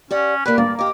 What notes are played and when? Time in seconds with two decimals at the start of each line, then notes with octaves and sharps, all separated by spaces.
0.11 C#4 G4 D5 F#5
0.46 A#3 D4 G4 B4
0.58 G2 A#3 D5
0.79 G4 D#5 D6